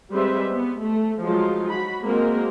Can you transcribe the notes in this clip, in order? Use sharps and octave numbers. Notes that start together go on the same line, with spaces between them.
G3 G#3 C4 B4 C5 E5
B3
A3
F3 F#3 G#3 D#4 F4
F#4 B5
G#3 A#3 C4 F#4 A#4